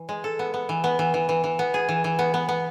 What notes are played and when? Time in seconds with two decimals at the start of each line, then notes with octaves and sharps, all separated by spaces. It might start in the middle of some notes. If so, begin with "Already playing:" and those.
Already playing: E3
0.09 G#3
0.24 A4
0.39 B3
0.54 B3
0.69 E3
0.84 B3
0.99 E3
1.14 E3
1.29 E3
1.44 E3
1.59 B3
1.74 G#4
1.89 E3
2.04 E3
2.19 B3
2.34 B3
2.49 B3